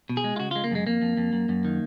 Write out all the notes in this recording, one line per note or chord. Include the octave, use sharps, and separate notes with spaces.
B2
G#4
G#3
F4
C#3 F#4
G#3 F4
A#3
F#2 G#3
F2 A#3
F2
F2
F#2
F#2
D#3